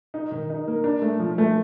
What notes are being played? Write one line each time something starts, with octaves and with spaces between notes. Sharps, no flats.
D#4
D#3
D#4
A#3
D4
A3
F3
A3